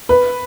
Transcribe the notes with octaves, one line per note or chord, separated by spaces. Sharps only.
B4